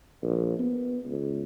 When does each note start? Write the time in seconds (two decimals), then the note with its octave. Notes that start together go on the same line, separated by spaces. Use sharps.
0.22 A#1
0.59 B3
1.07 C#2